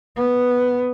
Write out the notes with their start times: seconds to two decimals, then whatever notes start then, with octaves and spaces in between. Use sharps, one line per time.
0.16 B3